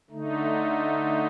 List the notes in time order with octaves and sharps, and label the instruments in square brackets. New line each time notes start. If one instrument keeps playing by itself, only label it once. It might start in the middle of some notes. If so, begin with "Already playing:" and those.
[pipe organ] D3 A3 D#4